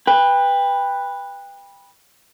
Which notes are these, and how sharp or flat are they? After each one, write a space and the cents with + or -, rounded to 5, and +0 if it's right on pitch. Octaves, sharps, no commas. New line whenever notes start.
B4 +0 G5 +30